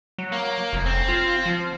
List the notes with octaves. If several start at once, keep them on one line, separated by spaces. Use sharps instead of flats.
F#3
A#3
F1
C4
F4
F3